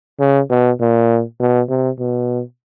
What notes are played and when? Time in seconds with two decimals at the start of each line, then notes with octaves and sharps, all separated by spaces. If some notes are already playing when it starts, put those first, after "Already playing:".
0.19 C#3
0.50 B2
0.80 A#2
1.40 B2
1.69 C3
1.99 B2